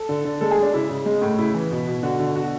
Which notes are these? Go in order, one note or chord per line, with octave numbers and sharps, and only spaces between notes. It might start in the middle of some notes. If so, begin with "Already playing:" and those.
Already playing: A4
D3
D3
G#3 A4
G#4
G#3
D4
C#3 E4
C#3
G#3
A2
C#3 E4
E3
B2
B2
D3 F#4
D3
B2 F#4